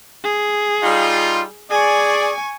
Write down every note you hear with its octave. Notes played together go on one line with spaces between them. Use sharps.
G#4
G3 D#4 F4
G#4 D5 G#5 C#6